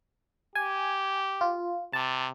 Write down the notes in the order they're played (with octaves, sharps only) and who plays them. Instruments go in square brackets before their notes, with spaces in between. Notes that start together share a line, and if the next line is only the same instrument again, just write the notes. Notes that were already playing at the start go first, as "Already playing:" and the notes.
[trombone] G4 [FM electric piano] G#5
[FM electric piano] F4
[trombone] C3 [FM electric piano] A5